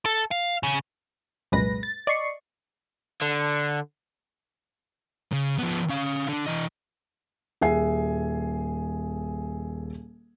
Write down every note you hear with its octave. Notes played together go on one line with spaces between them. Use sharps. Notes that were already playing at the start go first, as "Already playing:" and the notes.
A4
F5
C#3
C2 F#2 A#2 G#3 B4 A#6
A6
D5 D#5 C#6 C7 C#7
D3
C#3
F3 B3
C#4 F5
D3 D4
E3 D#5
D#1 G#4 E5 G#5 C7